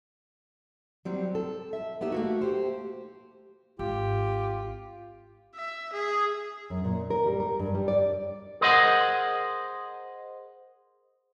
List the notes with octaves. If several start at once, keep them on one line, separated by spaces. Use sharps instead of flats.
F#3 G3 C4
A4
E5
A#3 B3 D#4 G4 E5
A3 A#3 F#4
G4 C5
G#1 F4 G4
E5
G#4
F#2
A#2
A#4
G3
A#4
G2
G3
D5
G#4 A#4 C5 D#5 F5 F#5